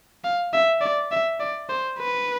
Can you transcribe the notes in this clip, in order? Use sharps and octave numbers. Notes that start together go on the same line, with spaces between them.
F5
E5
D5
E5
D5
C5
B4